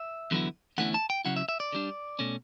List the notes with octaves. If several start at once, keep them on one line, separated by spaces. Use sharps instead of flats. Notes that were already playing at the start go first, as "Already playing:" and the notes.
Already playing: E5
E2 D3 F#3 B3 E4
E2 D3 A3 C#4 E4 F#5
A5
G5
C#3 F#3 C#4 E4 F#5
E5
E5
D5
D3 G3 D4
B2 A3 C#4